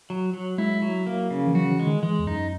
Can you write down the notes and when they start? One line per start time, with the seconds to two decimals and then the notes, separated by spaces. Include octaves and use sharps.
0.10 F#3
0.33 F#3
0.58 G#3 E4
0.82 F#3
1.07 A#3
1.31 C#3
1.47 E3
1.55 F#3 F#4
1.71 E3
1.79 G#3
1.87 D#3
2.03 E3 G#3
2.19 E2
2.27 F#2 D#4